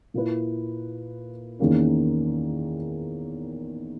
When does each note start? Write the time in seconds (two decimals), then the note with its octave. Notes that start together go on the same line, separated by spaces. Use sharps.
0.14 A#2 A#3 E4 B4
1.59 E2 D#3 A#3 C#4